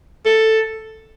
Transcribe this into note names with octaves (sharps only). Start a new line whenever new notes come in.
A4